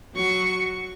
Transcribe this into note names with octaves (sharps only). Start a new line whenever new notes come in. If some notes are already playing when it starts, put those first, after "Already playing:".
F#3 C#6